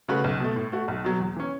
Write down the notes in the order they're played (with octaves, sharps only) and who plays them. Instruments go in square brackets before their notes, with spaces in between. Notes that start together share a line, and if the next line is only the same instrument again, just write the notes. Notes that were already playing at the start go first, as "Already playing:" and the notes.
[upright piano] C#3 A3 F#4 B4
B1
B2 A3
A2
A3 F#4
B1
B2 F#3
E2
E3 C#4